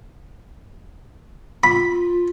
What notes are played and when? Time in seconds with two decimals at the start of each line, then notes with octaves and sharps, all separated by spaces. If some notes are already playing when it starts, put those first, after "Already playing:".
1.64 F4 B5